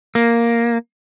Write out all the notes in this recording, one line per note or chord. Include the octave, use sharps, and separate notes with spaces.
A#3